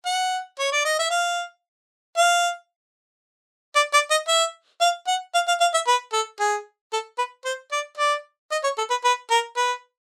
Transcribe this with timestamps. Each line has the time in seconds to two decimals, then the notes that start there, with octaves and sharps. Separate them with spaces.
0.06 F#5
0.59 C#5
0.72 D5
0.85 D#5
0.99 E5
1.11 F5
2.17 F5
3.76 D5
3.93 D5
4.11 D#5
4.28 E5
4.81 F5
5.07 F#5
5.35 F5
5.48 F5
5.61 F5
5.74 E5
5.87 B4
6.13 A4
6.40 G#4
6.93 A4
7.18 B4
7.45 C5
7.72 D5
7.98 D5
8.52 D#5
8.64 C#5
8.78 A4
8.90 B4
9.04 B4
9.31 A#4
9.57 B4